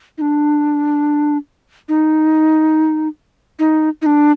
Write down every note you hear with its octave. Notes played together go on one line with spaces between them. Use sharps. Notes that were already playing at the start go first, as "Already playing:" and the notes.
D#4
D4
D#4
D#4
D#4
D4